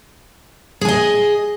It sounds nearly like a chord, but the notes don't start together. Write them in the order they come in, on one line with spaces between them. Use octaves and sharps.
G#4 G#5 D#5